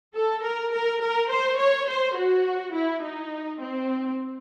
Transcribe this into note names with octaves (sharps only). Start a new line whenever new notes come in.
A4
A#4
A#4
A#4
C5
C#5
C5
F#4
E4
D#4
C4